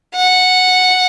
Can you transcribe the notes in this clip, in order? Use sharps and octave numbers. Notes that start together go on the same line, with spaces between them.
F#5